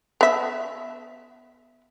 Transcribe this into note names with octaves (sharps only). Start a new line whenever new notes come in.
B3 E5